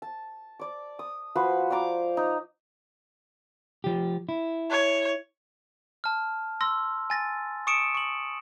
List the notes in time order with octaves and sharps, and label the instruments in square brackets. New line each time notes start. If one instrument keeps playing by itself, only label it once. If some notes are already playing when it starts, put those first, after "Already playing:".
[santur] A5
D5 D6
D#6
F3 F#4 B4 C5
D5 G5 A#5 D6
D#4
[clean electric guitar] F3 G4
E4
[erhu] C#5
[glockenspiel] A5 F6
C6 E6 A#6
G#5 A6 A#6
C#6 D#6 C#7 D7 E7
C#6 F#7